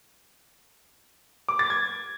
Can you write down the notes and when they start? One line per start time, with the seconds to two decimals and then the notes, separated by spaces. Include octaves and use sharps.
1.49 D6
1.59 A6
1.70 G#6